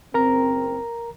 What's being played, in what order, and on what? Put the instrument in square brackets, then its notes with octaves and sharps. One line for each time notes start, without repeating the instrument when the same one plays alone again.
[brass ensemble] F#1 C4 [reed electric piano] A#4 A#5